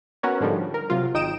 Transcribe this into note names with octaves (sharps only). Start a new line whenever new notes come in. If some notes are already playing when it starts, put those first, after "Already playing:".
B3 C#4 F#4 A#4 C#5
G#2 D3 F3 G3
A#4
C3 F#3 F4
G#1 D#4 G5 D#6 D7 E7